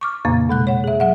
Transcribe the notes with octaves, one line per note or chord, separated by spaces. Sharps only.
C#6 D6 F6
F2 A#2 C#3 A#3
B2 G#3 F#6
C#5 F#5
G#4 E5
F#3 E5 F#5